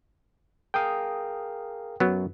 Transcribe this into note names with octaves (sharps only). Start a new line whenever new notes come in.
G#4 A#4 F5 G5 D#6
F#2 F#3 B3